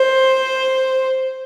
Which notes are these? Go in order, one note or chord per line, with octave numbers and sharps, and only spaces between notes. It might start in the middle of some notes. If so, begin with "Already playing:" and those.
Already playing: C5